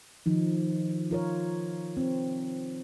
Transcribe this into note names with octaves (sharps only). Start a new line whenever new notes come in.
D#3 F3 D#4
F4 A#4 C#5
C4